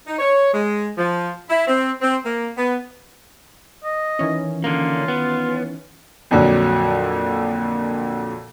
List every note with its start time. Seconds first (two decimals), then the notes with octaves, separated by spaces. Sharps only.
0.07 D#4
0.19 C#5
0.53 G#3
0.98 F3
1.50 E4
1.68 C4
2.02 C4
2.24 A#3
2.57 B3
3.84 D#5
4.19 D#3 E3 C#4
4.64 D3 A#3 F4
5.08 B3
6.31 F2 A#2 D3 F#3